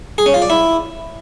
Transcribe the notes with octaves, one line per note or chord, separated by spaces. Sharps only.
G#4
C#4
F4
D5
E4